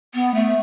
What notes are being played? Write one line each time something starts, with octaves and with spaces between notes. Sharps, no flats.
B3
A3